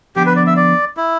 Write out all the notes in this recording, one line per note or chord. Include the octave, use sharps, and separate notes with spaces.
D3 F3 B3 D4 G4
B4
D5
E5
D5
E4